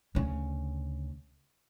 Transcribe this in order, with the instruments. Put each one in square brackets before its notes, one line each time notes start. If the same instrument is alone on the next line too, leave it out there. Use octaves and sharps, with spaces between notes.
[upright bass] D2 C#3